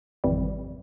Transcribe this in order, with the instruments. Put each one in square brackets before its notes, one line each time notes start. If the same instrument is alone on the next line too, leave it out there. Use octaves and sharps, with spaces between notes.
[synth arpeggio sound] G#1 F2 C3 E3 G3